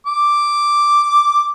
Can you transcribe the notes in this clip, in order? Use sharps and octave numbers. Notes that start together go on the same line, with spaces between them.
D6